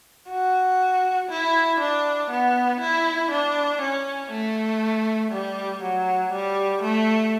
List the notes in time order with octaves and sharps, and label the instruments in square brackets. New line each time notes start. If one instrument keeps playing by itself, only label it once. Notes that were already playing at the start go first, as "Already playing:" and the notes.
[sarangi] F#4
E4
D4
B3
E4
D4
C#4
A3
G3
F#3
G3
A3